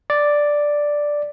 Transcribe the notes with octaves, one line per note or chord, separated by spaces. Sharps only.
D5